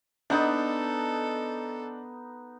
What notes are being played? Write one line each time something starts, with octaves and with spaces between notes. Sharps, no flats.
B3 D4 D#4 A4